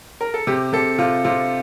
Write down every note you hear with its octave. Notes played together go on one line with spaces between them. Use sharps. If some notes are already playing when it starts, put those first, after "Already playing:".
A#4
A4
C3 G4
C3 A4
C3 F4
C3 F4